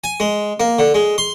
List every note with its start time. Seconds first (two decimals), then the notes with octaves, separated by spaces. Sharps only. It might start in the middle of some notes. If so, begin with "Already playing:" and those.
0.04 G#5
0.20 G#3
0.60 A#3
0.79 D3
0.94 G#3
1.18 C6